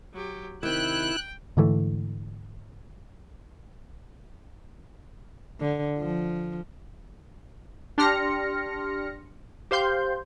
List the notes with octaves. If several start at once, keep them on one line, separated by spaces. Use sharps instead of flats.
F#3 G4
C3 D#3 E4 G5 F#6
G#2 D3 E3 A3
D3
F3
D4 G4 C6 F6 A#6 C#7
G4 C5 F5 C6 G6